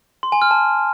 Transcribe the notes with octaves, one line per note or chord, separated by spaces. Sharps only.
C6
G#5
F6
A5